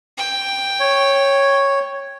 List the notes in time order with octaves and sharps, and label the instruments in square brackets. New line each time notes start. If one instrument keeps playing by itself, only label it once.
[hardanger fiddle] G5
[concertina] C#5